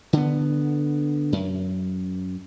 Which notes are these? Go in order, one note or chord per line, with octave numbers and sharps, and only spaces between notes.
D3 B3
F#2